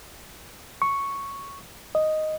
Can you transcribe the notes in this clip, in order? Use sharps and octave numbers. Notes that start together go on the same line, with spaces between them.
C#6
D#5